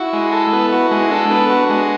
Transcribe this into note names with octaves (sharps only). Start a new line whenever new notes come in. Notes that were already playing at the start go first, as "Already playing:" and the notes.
Already playing: E4 F#4
G#3
A4
B3
F#4
G#3
E4
D4 A4
B3
F#4
G#3